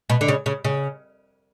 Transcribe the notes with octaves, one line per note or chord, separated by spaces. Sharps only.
B2
D3
C#3
C#3
C#3